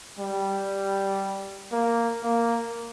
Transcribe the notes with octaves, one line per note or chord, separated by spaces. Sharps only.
G3
A#3
A#3